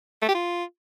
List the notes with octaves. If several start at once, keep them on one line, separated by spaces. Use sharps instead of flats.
A3
G4
F4